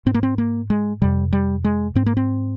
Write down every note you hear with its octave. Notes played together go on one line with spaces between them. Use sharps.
G#2 C4
A#3
C4
A#3
G#3
F2 C3 G3
G3
G#3
G#2 C4
A#3
C4